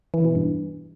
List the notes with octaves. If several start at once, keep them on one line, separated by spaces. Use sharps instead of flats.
E3
B2
G2